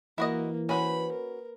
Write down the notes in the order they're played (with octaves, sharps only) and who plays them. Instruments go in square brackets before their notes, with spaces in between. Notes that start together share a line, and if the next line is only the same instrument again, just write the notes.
[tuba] E3 [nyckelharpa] A#3 [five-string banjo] E4 F#4 D#5
[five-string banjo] C#4 F#4 C5 [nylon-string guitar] B4 [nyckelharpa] B5
[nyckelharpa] A#4